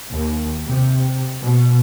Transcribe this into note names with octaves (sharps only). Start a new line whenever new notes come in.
D#2
C3
B2